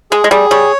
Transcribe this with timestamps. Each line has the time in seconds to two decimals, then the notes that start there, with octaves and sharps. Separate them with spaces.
0.11 G#3 G#4
0.24 G#3
0.31 G3 G#4
0.51 G3 C#5